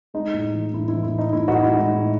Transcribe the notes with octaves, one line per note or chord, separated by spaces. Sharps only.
G#3 D#4
A2
E3
A2 E4
E4
E3
E4
A2
D#4
A2 E4
A2 D#4 F#4
E4
G#3
D#4
A2